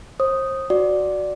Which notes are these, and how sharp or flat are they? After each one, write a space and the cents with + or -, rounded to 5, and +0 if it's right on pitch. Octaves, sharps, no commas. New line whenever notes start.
C5 +35 D#6 +0
F#4 +0 D5 +0